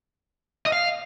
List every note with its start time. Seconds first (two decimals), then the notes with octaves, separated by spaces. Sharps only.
0.66 D#5
0.72 F5